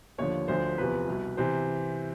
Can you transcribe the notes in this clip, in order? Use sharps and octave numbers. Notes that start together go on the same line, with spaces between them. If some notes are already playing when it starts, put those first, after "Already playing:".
D#2 D3 F3 C#5
D2 D3 F3 C5
E2 C3 F3 B4
C2 B2
C3 E3 C5